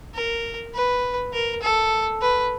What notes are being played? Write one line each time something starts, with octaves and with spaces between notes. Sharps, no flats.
A#4
B4
A#4
A4
B4